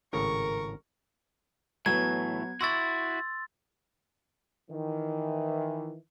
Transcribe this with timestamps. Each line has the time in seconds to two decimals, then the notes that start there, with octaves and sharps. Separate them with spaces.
0.13 G#1 A2 C#3 A#4 C#6
1.86 A2 E3 F#3 B3 G#6
2.61 E4 F#4 C6 C#6 E6 A6
4.71 D#3 E3